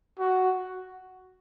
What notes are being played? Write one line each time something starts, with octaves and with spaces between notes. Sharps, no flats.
F#4